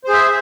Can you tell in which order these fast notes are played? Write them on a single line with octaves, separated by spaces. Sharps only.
C5 G#4 E5